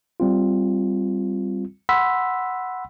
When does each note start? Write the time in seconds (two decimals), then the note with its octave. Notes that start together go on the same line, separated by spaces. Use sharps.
0.20 G3 C4 F4
1.89 F#5 B5 C6 E6 B6